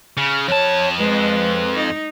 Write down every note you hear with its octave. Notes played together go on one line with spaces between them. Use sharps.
C#3
F2 C#5 A5
G#3 B4
D#4